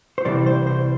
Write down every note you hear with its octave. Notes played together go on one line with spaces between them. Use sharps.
C5
C2 C3 E3 G3 D5
C5
C5